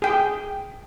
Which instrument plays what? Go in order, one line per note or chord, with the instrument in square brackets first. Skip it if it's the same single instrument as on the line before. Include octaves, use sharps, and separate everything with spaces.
[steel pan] G#4 G5